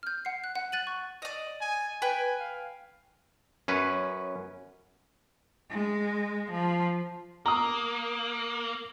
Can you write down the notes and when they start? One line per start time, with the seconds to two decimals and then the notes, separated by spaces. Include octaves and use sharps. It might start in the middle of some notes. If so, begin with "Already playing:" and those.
0.03 F6 G6
0.25 F#5 C7
0.44 F#6
0.55 F#5
0.72 F#6 A6 D#7 F#7
0.87 C#6
1.22 D5 D#5
1.61 G#5
2.02 B4 G5 G#5
2.40 F5
3.68 F#2 C#4 B4
5.70 G#3
6.51 F3
7.46 A#3 A#5 D#6